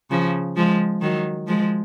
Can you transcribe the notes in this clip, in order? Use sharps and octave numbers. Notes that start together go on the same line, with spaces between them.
C#3 F3
F3 G#3
D#3 F#3
F3 G#3